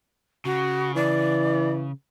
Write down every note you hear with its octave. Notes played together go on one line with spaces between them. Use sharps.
C#3 F#4
E3 D5